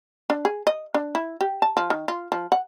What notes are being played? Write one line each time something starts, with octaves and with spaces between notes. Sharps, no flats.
D4
G#4
D#5
D4
E4
G4
A5
F3
D#3
F4
F3
F#5